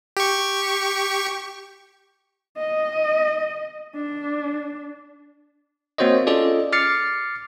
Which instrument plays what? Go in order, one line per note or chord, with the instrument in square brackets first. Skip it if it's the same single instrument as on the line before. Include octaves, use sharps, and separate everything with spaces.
[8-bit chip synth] G4 C#6
[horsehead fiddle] D#5
D4
[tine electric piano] A#3 C4 F#4 C5 C#5 D#5
C#4 F4 G#4 A4 D5 D#5
D6 F6 A6 C7 C#7